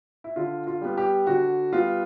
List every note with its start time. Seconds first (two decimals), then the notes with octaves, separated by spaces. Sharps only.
0.24 E4
0.36 D3 F4
0.67 F4
0.81 G3 B3
0.98 G4
1.27 D3 F#4
1.72 G3 B3 F4